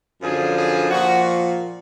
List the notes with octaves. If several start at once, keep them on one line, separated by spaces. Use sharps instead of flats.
F#2 D3 F3 G#4
G#4
A#2 F3 F#4